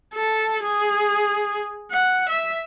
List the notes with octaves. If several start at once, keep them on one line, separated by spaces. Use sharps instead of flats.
A4
G#4
F#5
E5